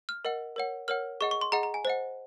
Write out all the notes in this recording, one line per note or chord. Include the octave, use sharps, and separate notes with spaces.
F6
A#4 D#5 F#5
A#4 C#5 F#5
A#4 C#5 F#5 F6
G#4 D#5 F#5 C#6
C#6
C6
G#4 D#5 F#5 A#5
A#5
G#5
C5 D#5 F#5